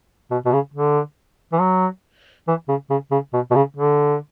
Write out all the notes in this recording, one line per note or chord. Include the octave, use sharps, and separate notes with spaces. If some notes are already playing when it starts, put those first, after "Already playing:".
B2
B2
C#3
D3
E3
F#3
E3
C#3
C#3
C#3
B2
B2
C#3
D3